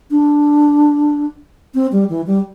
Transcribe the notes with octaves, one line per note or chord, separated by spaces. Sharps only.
D4
C4
G3
E3
G3